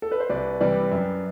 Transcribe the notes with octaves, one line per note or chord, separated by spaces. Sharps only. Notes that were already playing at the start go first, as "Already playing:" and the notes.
A4
B4
C5
C2 B4 D5
C3 E3 G3 B4 D5
F#2